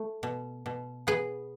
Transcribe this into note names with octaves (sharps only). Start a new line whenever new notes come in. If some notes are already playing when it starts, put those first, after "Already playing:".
Already playing: A3
B2
B2
B3 G#4 B4